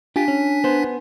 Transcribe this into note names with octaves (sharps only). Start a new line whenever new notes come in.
D4 F4 G4 G#5 B6
C#4
B3 C5